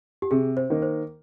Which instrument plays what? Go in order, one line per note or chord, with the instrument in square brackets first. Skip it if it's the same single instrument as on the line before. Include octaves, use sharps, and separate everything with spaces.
[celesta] G4
[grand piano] C3 [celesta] G#4
[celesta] C5
[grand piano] D#3 A#3
[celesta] C5